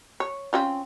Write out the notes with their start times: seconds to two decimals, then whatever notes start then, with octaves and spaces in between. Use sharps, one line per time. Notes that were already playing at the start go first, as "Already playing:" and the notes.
0.20 C#5
0.53 C4 C#4 F4